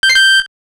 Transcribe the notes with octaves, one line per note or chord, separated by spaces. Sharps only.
G6
C7
G6